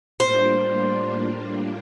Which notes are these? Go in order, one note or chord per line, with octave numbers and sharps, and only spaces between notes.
A2 G3 A#3 D4 F4 C5